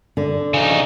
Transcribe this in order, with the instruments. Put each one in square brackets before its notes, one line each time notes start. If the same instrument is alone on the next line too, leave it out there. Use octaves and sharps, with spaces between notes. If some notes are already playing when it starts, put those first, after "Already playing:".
[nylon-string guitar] D3
[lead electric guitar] C#3 D#4